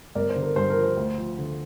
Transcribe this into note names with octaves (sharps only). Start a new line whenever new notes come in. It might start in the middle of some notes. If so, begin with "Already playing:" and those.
G1 A#4 D5
C5
D3
A#4
G2 C5
A#4
F3
C5
D2
F3
D3